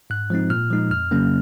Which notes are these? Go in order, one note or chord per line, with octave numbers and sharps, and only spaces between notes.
G#2 F#6
F3 G#3 C4 D#4
A#2 F6
F3 G#3 D#4
F2 F6
C#3 F#3 A#3 C#4